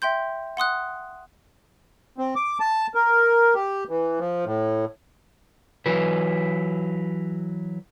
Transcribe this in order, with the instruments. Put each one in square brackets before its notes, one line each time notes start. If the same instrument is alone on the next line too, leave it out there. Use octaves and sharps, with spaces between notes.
[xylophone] E5 G5 C6 G6
F#5 C6 D#6 F#6
[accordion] C4
D6
A5
A#4
G4
E3
F3
A2
[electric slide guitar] E3 F#3 B4